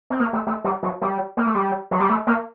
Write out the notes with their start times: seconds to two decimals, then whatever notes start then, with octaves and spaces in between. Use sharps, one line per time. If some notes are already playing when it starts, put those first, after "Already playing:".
0.10 C4
0.20 A#3
0.33 A3
0.47 A3
0.64 G3
0.83 F#3
1.02 G3
1.37 A#3
1.46 A3
1.55 G3
1.91 F#3
2.00 G3
2.09 A3
2.27 A#3